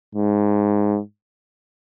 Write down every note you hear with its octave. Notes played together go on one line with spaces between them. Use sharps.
G#2